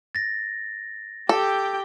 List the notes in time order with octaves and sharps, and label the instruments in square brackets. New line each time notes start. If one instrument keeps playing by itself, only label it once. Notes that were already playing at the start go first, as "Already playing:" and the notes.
[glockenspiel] A6 A#6
[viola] G4 G5 [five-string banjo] A4